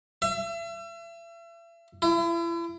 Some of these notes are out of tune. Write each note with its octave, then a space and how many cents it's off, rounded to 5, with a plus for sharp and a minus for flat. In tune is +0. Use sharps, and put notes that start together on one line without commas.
E5 +40
E4 +40